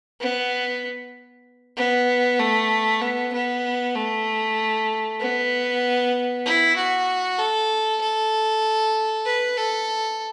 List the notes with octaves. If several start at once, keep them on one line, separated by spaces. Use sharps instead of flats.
B3
B3
A3
B3
B3
A3
B3
E4
F#4
A4
A4
B4
A4